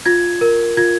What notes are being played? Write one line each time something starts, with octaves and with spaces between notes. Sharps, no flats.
F4 G#6
A#4
F4 G#6